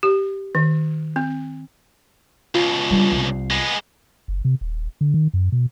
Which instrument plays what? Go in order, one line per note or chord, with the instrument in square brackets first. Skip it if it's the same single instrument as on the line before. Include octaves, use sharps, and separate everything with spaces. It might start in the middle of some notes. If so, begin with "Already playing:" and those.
[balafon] G4
D#3
C4
[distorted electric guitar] C#2 B2 [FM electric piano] F4
[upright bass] D3 G3
C2
[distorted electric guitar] G#3 B3
[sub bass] F#1
C3
D#1
D3
D#3
F#2
B2